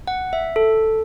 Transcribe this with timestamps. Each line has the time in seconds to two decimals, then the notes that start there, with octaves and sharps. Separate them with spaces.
0.07 F#5
0.33 E5
0.56 A4